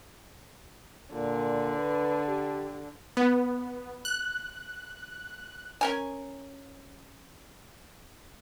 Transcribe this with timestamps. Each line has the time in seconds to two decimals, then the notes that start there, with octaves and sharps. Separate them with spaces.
1.13 A#2 D3
1.76 B4
2.28 G4
3.17 B3
4.05 F#6
5.81 C#4 A#4 G#5